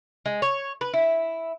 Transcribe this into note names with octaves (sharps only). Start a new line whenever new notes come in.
G#3
C#5
B4
E4